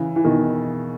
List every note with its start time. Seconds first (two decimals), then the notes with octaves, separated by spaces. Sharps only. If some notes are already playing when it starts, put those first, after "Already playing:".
Already playing: C#3 E3
0.16 E3
0.24 B2 D#3